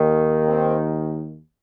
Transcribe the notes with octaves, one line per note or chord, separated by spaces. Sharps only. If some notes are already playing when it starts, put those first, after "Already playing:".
Already playing: D#2 D#3
C4